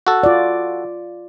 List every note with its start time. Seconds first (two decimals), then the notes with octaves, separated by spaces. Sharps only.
0.07 F#4 A4
0.23 F4 D5